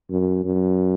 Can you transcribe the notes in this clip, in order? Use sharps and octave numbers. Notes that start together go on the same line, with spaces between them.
F#2
F#2